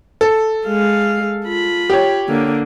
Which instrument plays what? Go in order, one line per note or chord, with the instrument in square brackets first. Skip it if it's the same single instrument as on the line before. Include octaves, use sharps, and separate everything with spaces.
[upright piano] A4
[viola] G#3 F5
F4 B5
[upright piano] G4 C#5
[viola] D3 A#3